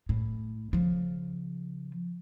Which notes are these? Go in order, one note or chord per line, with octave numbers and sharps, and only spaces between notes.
A2
C#3 F3